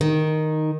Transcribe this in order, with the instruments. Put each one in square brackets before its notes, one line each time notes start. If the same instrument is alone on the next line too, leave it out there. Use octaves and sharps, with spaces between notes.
[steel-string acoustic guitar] D#3